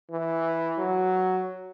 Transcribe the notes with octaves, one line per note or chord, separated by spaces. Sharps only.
E3
F#3